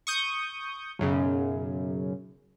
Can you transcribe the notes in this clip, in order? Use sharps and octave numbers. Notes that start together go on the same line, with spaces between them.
C#6 D#6 G6
B1 F#2 C#3